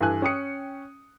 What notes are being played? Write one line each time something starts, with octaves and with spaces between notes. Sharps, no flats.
G2 E3 A4 G#5 F#6
C#4 G5 D#6 C#7